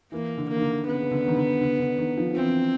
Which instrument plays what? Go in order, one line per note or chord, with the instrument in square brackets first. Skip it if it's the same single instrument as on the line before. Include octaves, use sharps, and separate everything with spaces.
[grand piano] E3 [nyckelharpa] A#3
[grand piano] D3
[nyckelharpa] A#3
[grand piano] D#3
D3
[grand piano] C#3 [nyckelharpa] B3
[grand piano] C#3
D3
D#3
D3
D3
D3
D#3
F3
F3
[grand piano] E3 [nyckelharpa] C4